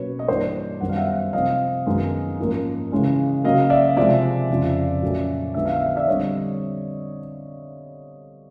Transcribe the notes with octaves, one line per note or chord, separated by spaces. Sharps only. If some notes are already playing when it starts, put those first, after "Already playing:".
Already playing: B2 F#3 A#3 C#4 B4 C#5
D#5
G2 E3 G3 A#3 C5 D5
F#2 D#3 G3 B3 F#5
F5
E5 F#5
E5 F#5
C3 F3 A3 C4 D#5 F5
F#2 D#3 G#3 B3
G#2 F3 A#3 C#4
C#3 E3 G#3 C#4
C#3 F#3 A#3 D#5 F5
D5 E5
C3 F3 G#3 D5 E5
F2 C#3 F3
A#2 F#3 A3 C#4
D3 F3 G#3 B3 E5
F5
E5
F5
D5 E5
D3 G3 C4 C#5 D#5